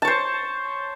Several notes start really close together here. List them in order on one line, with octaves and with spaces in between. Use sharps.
A5 C#5 C5